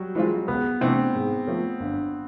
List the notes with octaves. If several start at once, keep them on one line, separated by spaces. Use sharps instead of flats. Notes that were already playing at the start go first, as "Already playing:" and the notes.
Already playing: F#3 G3
E3 G#3 C4 F4
C#2 B3
C3 E3 A3 C4 D4
G#2
F3 A3
G1